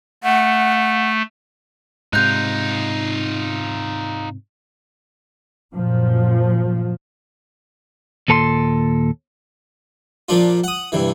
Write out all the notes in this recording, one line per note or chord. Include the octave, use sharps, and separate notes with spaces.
A3 F#5
G#2 C3 D#4 F4 F#6 G6
F#2 A#2 F3
D#2 A#2 A4 A#5 C6
A#2 F3 D4 F4
F#5 D#6
G2 C3 E3